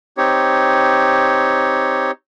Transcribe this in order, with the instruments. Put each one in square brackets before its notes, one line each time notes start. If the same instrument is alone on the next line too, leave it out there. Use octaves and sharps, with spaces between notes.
[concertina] C4 D#4 G4 C#5